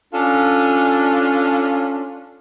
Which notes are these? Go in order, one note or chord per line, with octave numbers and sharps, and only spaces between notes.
C#4 D4 F4 A4